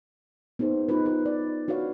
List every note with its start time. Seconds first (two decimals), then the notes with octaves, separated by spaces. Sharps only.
0.59 B3 D#4 G#4 C5
0.89 B3 D#4 F4 G4 B4
1.06 B4
1.26 D5
1.68 D4 F#4 B4 C#5 F5